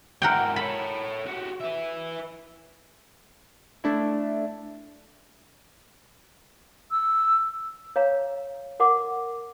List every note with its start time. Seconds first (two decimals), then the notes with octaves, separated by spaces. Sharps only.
0.22 G#2 E4 A#4 F#5 G5
0.56 A4 C#5 B5
1.26 F#4 G4
1.60 B4 E5
3.84 A3 D4 E4
6.91 E6
7.96 C#5 F5 A#5
8.80 A#4 F#5 C6 D6